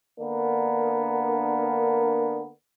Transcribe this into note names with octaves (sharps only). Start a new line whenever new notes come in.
D3 A#3 B3 D4 A#4